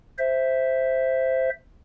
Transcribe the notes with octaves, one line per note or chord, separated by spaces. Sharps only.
C5 E5